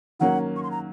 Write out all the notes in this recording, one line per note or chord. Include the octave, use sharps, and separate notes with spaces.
D#3 F#3 A#3 C#4 F#5
C#6
C6
A#5